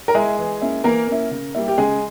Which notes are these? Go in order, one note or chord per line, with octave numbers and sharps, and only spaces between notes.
A#4
G#3 E4 G#4
E3
A#3 C#4 E4
E3 A#3 A#4
A#3 C#4 E4
C#3
G3 A#3 E4
G4
C#3 G#3 G#4